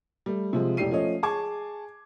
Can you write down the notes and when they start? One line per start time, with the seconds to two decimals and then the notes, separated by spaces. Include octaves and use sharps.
0.26 G3 A3
0.53 C3 F3 G#3
0.77 E1 A2 G4 D5 C7 D#7
0.91 F3 A3 C#4 C#5 D#5
1.23 G#4 A5 C#6 D6 G#6